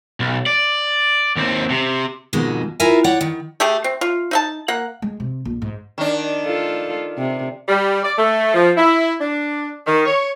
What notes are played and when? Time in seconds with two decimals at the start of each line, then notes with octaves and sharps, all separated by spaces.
0.20 B1
0.46 D5
1.36 D#2 C4
1.70 C3
2.33 F2 G#2 B2 D#3 G#3
2.80 E4 F4 A#4 E5 G#5
3.04 C#5 D5 F#5 G5
3.21 D#3
3.60 A3 G4 G#4
3.84 C4
4.01 F4
4.31 D#4 E5 A5
4.68 A#3 F#5
5.02 G#3
5.20 C3
5.45 A#1
5.62 G#2
5.98 D#3 D4
6.45 F4 A4
7.18 C3
7.68 G3
8.02 D5
8.18 A3
8.54 F3
8.77 E4
9.20 D4
9.87 D#3
10.05 C#5